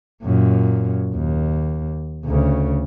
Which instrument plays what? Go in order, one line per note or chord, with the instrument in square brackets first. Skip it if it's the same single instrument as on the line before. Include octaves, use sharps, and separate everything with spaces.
[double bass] F#2 A#2
D#2
D2 C#3